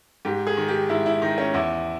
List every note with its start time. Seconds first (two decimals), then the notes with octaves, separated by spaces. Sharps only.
0.25 G#2 G4
0.47 G#4
0.57 D#3
0.68 G4
0.89 G#2 E4
1.06 E4
1.22 D#3 D#4
1.38 C#4
1.54 E2 E4